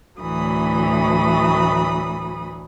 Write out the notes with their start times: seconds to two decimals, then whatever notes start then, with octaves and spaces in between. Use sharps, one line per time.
0.21 D2 A2 E3 F#3 B5 D#6